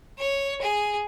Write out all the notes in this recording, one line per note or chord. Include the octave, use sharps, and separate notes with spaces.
C#5
G#4